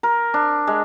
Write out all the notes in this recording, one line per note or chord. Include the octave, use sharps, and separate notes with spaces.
A#4
D4
G#3